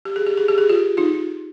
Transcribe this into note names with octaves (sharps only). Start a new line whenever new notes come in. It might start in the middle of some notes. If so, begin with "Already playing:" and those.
G4
G#4
G4
G#4
G4
G#4
F4 G4
D#4 F4